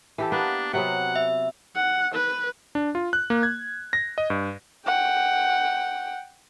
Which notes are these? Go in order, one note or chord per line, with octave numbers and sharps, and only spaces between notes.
E3 G4 A4
A#3 B3 D4 B4
C3 F#3 B3 F#5
E5
F#5
B4
D4
F4
F#6
A#3
G#6
A#6
D#5
G2
F#5 G5